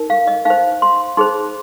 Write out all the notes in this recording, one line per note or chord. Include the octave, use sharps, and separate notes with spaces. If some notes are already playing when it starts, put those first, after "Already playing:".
Already playing: D#4 A#4
F5
D#5
D#4 C5 F5
C6
D#4 G#4 C5 C6